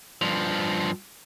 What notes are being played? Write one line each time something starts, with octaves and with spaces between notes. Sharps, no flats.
G2 F3